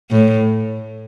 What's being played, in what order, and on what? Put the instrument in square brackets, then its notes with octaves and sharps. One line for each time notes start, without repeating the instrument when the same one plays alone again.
[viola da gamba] A2